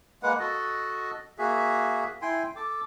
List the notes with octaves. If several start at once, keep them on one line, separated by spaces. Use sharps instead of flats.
G#3 A#3 B4 F#5
F#4 A4 D#5
A#3 F#4 G#4 E5
E4 G5 G#5 C6
A4 D6